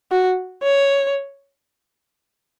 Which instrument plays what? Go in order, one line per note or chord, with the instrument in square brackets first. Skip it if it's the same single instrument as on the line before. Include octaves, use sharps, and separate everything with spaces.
[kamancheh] F#4
C#5